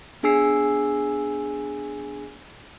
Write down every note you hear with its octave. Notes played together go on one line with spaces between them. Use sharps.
B3 D4 G#4 G#5 E6 C7